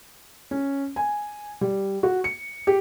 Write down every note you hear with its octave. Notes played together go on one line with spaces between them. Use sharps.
C#4
G#5
G3
F#4
C#7
G4